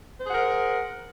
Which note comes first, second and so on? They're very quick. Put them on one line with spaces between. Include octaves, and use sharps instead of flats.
C5 G#4 F#5 A#4